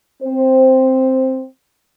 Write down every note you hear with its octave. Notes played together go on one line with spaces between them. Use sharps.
C4 C5